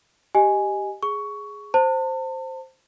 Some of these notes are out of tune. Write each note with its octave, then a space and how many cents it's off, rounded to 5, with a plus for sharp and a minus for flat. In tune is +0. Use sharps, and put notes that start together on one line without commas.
G4 -5 D#5 +0 G#5 +0
G#4 +0 C#6 +15
C5 +0 A5 +35